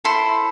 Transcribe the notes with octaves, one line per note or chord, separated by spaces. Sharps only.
E4 A4 C5 C6